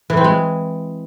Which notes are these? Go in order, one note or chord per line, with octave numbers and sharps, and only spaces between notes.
E3
C4
G#3